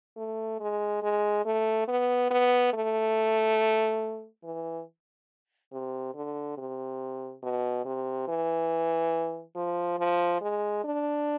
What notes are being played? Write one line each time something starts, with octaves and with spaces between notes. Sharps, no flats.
A3
G#3
G#3
A3
B3
B3
A3
E3
C3
D3
C3
B2
C3
E3
F3
F3
G#3
D4